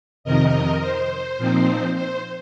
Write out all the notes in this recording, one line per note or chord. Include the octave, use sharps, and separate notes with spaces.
F2 C3 D#3 A#4 D#5
C5
A#2 F3 C4 D#4
C5